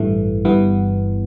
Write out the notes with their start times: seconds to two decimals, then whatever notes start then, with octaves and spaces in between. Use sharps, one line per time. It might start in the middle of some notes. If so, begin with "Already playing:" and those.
Already playing: A1 G2 E3 A3
0.45 G1 G2 E3 B3